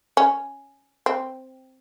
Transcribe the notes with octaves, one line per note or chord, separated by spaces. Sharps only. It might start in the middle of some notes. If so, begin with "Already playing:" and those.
C#4
C4